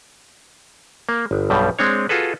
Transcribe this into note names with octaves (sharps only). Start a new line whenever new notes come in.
A#3
G1
B1 G2 B2 G3
G#3 C4 D4 C#5
F4 F#4 G#4 A4 B4